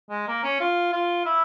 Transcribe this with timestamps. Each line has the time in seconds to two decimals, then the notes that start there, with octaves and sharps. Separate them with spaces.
0.10 G#3
0.27 A#3
0.43 C#4
0.60 F4
0.92 F4
1.25 E4